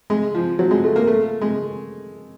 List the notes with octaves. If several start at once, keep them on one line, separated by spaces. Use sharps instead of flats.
G#3
F3
F#3
G#3
A3
A#3
A3
G#3